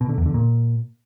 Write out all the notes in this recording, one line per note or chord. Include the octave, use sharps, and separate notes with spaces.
B2
D3
E2
D3
A#2